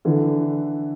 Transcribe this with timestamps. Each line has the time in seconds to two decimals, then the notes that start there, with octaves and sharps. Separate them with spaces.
0.05 D3 E3